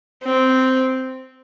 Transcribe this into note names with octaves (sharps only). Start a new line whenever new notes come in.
C4